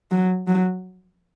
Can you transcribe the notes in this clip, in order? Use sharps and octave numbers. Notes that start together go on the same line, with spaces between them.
F#3
F#3